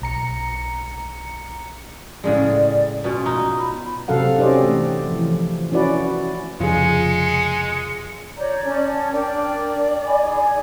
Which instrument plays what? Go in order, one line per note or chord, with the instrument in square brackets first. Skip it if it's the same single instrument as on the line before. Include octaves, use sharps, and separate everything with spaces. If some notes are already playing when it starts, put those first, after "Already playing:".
[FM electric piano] B1 A#5 C#7
[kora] A2 C#3 G#3 [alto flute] D5
[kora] B2 C#4 [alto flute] F4
[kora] D#4
[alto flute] B5
[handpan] C3 F#3 C4 A4 F5 F#5
C#4 D#4 G4 C5 D5 D#5
E3 A3
E3 F3
C#4 E4 F#4 B4 D5
[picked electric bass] F1 C#3 F3 [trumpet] G#3 [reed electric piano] F4 G#4 [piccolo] C#7
[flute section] C#5 A#5 G6 [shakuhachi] D5
[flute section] C#4 A5
[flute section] D4 A#4 G5 [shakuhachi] D5
[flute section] D#5 G#5 B5
D#4 G#4 G#5